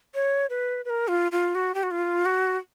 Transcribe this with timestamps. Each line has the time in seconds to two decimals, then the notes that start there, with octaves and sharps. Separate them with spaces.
0.15 C#5
0.50 B4
0.85 B4
0.90 A#4
1.08 F4
1.32 F4
1.55 F#4
1.74 G4
1.83 F#4
1.91 F4
2.25 F#4